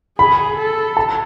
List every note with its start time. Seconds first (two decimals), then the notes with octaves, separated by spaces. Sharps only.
0.19 G#4 B5
0.57 A4
0.97 A5